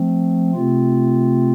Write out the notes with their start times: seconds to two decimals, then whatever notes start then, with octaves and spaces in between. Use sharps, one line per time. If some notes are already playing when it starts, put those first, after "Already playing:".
Already playing: F3 A3 C4
0.54 C3 A3 C4 F4